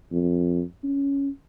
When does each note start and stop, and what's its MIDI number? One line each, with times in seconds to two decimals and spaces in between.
0.12 0.62 41
0.84 1.29 61